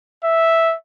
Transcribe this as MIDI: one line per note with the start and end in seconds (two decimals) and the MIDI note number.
0.25 0.75 76